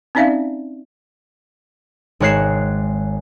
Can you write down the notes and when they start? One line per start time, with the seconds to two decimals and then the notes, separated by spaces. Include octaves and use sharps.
0.15 C4 C#4 D#4 D5 E5 F5
2.20 G#1 G#3 C#5 F#6 C7 E7